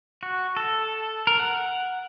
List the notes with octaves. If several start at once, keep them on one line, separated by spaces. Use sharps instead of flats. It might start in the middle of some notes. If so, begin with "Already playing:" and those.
F#4
A4
A#4
F#5